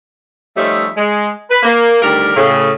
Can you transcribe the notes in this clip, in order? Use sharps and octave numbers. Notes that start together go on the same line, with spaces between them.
F3 G3 A3 C#4 D#4 E5
G#3
B4
A#3
D2 D#3 G3 G4 A#4
A2 C#3